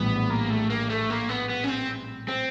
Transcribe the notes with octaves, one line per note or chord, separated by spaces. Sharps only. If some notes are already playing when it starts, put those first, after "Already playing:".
Already playing: A#1 A2 E3 G3 B3
A#3
A3
A#3
A3
A#3
B3
B3
C#4
C4
C4